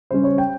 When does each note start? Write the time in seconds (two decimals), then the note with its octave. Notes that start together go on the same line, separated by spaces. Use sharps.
0.11 C#3 G3 C#4 C5
0.24 C#5
0.38 G5